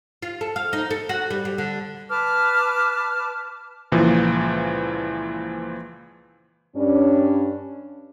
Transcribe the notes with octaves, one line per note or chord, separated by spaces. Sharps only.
F4
A4
F5
D#4
A4
F#4
G3
G3
D3
B4 A5 D6 F6
C#2 A#2 E3 F3
G2 C#4 D4